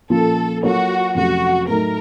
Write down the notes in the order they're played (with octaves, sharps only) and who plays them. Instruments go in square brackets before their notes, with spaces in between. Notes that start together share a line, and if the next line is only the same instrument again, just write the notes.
[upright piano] A#2 F3 A#3 C#4 F4 [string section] A4
[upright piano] F#3 A#3 F4 A4 C#5 [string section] F#4
[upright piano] F2 C3 F#3 A3 C#4 [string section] F#4
[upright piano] A2 F#3 A3 D#4 [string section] A#4